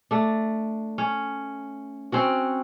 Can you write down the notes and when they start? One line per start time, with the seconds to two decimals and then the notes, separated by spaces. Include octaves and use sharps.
0.11 A3 D4
0.98 C#4
2.12 C4 C#4 F#4